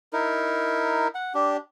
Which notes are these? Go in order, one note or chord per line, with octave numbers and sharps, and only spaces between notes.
D#4 E4 A#4
F#5
D4 G4